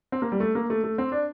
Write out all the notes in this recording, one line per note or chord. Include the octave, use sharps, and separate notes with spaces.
C4
A#3
G3
A3
A#3
A3
A3
C4
D4